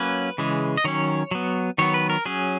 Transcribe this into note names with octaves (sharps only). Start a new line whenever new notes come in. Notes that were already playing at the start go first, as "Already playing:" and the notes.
Already playing: F#3 A#3 C#4 B4
C#3 E3 G#3
D#5
D#3 F#3 C#4 C#5
F#3 B3
D#3 F#3 B3 C#5
B4
A#4
F#3 C#4 G#4